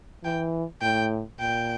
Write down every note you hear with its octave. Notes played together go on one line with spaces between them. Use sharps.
E3 G5
A2 G5
A#2 G5